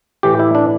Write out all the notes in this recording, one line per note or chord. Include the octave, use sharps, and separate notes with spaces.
A2 E3 G4
E4
D4